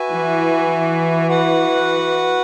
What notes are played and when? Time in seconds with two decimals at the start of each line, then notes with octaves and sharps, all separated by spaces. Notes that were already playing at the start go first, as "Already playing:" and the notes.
Already playing: F#4 B4 E5 G#5
0.10 E3
1.28 F#4 B4 F#5